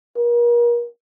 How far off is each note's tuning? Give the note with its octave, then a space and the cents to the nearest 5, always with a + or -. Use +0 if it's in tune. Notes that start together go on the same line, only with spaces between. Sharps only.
A#4 +35